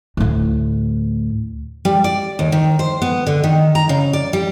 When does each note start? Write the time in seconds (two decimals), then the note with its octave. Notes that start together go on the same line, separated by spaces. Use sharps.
0.17 D2 A2
1.85 G3
2.04 D5
2.39 D#2
2.52 D#3
2.79 C5
3.02 B3
3.26 D3
3.44 D#3
3.75 A#5
3.89 C#3
4.13 D5
4.33 G3